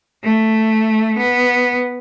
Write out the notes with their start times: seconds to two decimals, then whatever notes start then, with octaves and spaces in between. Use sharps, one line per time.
0.24 A3
1.18 B3